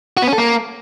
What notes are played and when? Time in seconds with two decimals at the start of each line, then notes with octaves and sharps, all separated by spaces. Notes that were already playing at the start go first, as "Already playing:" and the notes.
0.17 F#4
0.22 B3
0.28 C#4
0.33 A4
0.38 A#3